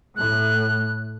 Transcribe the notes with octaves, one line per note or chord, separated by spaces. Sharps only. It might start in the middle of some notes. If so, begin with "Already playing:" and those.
A2 F#6